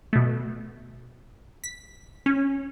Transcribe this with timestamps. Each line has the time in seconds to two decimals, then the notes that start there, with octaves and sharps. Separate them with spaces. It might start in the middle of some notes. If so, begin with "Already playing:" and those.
0.13 B2 A3
1.64 B6
2.26 C#4